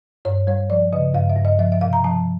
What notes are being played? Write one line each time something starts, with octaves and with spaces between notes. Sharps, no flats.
G2 C#5
G3 C#5
F3 D5
C#3 D#5
G2 F5
E5
G2
D#5
F3 E5
E5
C3 F5
A#5
F3 A5